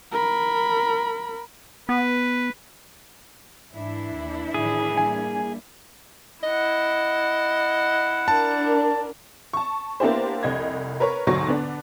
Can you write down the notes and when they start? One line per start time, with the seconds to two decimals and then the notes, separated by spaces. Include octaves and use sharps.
0.12 A#4 B5
1.89 B3 B4
3.72 G#2 E3 D4 E4
4.14 D#2
4.54 A2 D#3 F3 G#4
4.98 G3 A#3 G#5
6.43 E4 D#5 F#5
8.28 D4 A#4 A5
9.53 A5 C#6
10.00 A#3 B3 D4 E4 G4 C5
10.43 F1 C2 D#5 G#6
11.00 A#4 B4 C#5
11.27 D2 G#2 B2 F#3 C#6
11.48 D3 B3 D4